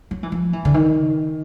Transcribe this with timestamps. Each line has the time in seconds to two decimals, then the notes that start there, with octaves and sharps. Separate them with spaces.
0.11 F#3
0.23 E3
0.32 F3
0.53 E3
0.65 D3
0.74 D#3